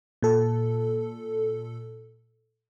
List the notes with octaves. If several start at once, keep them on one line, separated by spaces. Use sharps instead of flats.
A#2 A4